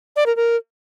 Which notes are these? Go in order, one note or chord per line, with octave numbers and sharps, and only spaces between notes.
D5
A#4
A#4